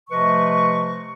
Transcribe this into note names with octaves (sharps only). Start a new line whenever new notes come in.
C3 F3 A3 B4 D#5 C#6